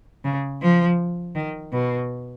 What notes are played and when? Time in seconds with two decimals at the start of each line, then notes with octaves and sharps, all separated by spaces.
0.25 C#3
0.62 F3
1.35 D#3
1.73 B2